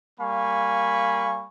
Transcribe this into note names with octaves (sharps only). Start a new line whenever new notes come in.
G3 A#3 F5 G#5 B5 C#6